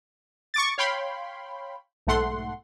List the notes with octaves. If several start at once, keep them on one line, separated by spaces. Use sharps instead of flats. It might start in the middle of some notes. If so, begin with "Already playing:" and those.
C#6 D6 A6
C#5 F5 G5 B5 C6
B1 G#2 A3 F#5 C6